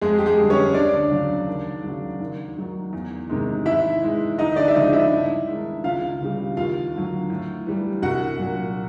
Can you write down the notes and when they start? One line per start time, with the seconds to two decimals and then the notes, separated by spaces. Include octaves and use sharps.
0.01 F2 G#3 G#4
0.19 G4
0.26 G#3 G#4
0.38 D3 G3
0.50 C#4 C#5
0.74 D2 D4 D5
1.11 C#3 F#3
1.47 D#2
1.84 C#3 F#3
2.20 D#2
2.56 D#3 F#3
2.93 E2
3.29 C3 D#3 G#3
3.66 G#2 E4 E5
4.02 E3 G#3
4.38 D2 D#4 D#5
4.56 D4 D5
4.68 E5
4.75 C#3 F3 G#3 D#4 D#5
4.93 E4 E5
5.11 G2
5.48 D#3 G#3
5.84 C#2 F4 F5
6.21 C#3 E3 G3
6.57 D#2 F4 F5
6.94 D3 F#3
7.30 A2
7.66 E3 G3
8.02 C2 F#4 F#5
8.39 A#2 F#3